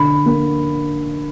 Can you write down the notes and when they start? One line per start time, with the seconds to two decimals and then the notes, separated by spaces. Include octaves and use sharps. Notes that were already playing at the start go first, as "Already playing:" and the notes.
Already playing: D3 B5
0.26 A#3